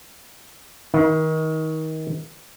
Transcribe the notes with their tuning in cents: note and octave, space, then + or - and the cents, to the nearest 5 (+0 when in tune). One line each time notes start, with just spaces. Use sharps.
D#3 +25 D#4 +30